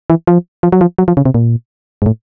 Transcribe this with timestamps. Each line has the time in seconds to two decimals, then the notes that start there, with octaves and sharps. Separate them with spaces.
0.10 E3
0.27 F3
0.63 F3
0.72 F#3
0.81 F3
0.98 F#3
1.08 F3
1.17 C#3
1.25 C3
1.34 A#2
2.02 G#2
2.06 A2